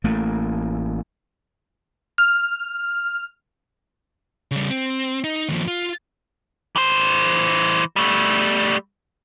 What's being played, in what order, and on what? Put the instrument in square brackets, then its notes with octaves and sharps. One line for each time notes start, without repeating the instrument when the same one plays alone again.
[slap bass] A1 A3 A#3
[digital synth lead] F6
[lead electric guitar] C#3 G3
C4
D#4
D#2 F3
F4
E3 C5
G3 A3